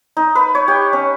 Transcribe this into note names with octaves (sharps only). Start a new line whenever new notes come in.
D#4
B4
C#5
G4
C#4